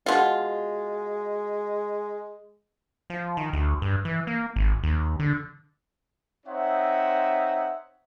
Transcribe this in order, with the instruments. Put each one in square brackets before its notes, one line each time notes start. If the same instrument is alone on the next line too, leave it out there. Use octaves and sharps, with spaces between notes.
[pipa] B2 F4 [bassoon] G#3
[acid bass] F3
D#3
D2
G2
E3
A#3
G#1
D#2
D3
[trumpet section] C4 D#4 C5 C#5 E5 F#5